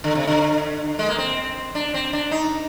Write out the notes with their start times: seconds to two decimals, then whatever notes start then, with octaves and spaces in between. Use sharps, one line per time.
0.04 D3
0.15 C3
0.27 D3
0.99 G#3
1.08 A#3
1.18 C4
1.75 D4
1.94 C4
2.13 D4
2.31 D#4